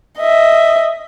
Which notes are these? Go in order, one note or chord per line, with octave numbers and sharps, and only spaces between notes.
D#5 E5